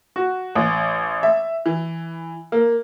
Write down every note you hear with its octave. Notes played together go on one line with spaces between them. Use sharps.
F#4
A1
E5
E3
A#3